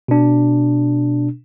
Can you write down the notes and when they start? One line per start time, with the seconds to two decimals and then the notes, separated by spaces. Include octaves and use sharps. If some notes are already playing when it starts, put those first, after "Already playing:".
0.08 B2 D4